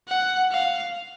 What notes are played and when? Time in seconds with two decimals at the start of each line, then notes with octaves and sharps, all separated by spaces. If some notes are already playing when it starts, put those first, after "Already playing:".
0.08 F#5
0.52 F5